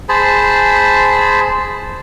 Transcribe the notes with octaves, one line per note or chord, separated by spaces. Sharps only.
G#4 C5 A5 B5